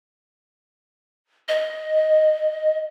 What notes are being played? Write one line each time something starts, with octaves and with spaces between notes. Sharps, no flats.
D#5